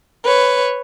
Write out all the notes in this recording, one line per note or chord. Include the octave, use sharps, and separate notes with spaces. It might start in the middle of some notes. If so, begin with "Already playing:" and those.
B4 C#5